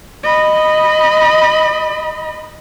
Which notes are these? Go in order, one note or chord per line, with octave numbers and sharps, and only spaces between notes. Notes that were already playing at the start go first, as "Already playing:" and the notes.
D#5 B5